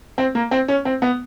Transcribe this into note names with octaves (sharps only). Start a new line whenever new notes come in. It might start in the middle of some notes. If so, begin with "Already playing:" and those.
C4
A#3
C4
C#4
C4
B3